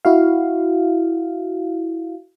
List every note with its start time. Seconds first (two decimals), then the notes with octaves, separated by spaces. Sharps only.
0.05 E4 F#4 F5